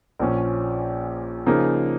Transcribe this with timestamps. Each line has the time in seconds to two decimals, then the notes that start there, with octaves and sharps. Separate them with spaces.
0.20 A#1 A#2 F3 C#4
1.46 C#3 F3 A#3 D#4 G#4